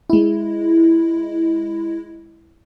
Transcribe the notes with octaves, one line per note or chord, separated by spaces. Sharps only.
G#3 E4